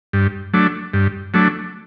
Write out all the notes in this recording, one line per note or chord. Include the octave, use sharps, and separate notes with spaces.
G2
F#3 A3 D4
G2
F#3 A3 D4